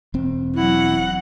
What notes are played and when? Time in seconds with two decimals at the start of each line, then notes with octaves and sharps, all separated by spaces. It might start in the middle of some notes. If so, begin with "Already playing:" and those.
0.14 E1 C4
0.56 F#3 E4 F#5